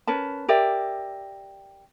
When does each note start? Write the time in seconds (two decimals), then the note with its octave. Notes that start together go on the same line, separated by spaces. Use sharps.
0.07 C#4 A#4 B4 A5
0.48 G4 A#4 D5 E5